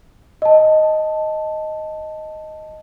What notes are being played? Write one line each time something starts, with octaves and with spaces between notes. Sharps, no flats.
D#5 A5